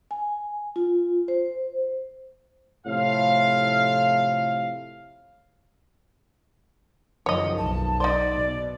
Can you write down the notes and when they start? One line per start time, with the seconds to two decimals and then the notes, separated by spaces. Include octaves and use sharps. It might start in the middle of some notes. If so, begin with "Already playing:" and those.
0.11 G#5
0.76 F4
1.28 C5
2.86 A2 C3 F3 E4 F5
7.26 F#1 D#3 F3 C#5 D#5
7.58 B1 A5
8.00 D#4 C5 D5
8.32 B2